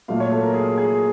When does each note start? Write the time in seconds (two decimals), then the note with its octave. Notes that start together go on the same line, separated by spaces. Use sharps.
0.08 A#2 F#3 A3 F5
0.20 C#5
0.32 A4
0.43 A#4
0.54 G#4
0.77 G#4